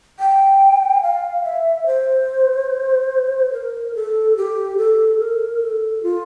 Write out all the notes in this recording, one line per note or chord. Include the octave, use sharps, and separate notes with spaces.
G5
F5
E5
C5
A#4
A4
G4
A4
A#4
A4
F4